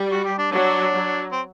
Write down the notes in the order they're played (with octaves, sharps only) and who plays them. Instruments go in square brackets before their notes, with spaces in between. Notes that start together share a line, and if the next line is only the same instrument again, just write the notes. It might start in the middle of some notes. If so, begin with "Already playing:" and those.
Already playing: [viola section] G3
[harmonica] F#4
G4
D4
[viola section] F#3 [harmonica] D4
[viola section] F#3
[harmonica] C4